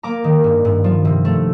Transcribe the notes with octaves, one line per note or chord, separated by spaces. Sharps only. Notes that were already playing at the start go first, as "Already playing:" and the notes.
A#3 A#5 D6
D#3
G2
G2
F3
C3
A3